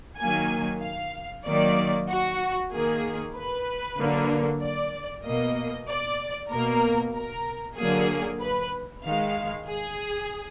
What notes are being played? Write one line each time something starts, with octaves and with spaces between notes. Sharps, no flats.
D#3 F#3 A#3 G#5
F5
D#3 F#3 A#3 D5
F#4
D#3 A#3 G#4
B4
D3 F#3 A#3
D5
B2 A#3 D#5
D5
B2 A#3 A#4
A#4
D3 F#3 A#3 G#4
B4
D#3 G#3 F5
G#4